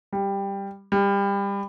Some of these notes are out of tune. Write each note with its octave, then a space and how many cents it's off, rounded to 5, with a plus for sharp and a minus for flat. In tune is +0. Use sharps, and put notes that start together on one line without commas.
G3 +10
G3 +25